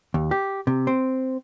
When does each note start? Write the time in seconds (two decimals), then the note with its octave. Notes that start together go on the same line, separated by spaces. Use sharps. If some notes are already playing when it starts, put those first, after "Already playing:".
0.14 D#2
0.31 G4
0.67 C3
0.87 C4